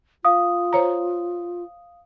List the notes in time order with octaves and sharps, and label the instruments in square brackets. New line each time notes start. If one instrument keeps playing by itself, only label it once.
[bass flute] F4 [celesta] F5 D#6
[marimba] C5 C#5 A#5